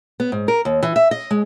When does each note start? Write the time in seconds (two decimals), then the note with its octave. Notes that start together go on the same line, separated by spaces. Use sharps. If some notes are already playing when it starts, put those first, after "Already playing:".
0.20 B3
0.32 G#2
0.48 A#4
0.65 D#2
0.83 E3
0.96 E5
1.11 D#5
1.31 G#3